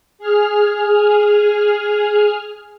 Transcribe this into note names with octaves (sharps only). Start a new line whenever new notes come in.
G#4 F6